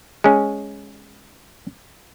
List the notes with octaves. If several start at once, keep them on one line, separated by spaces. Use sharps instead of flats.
G#3 C#4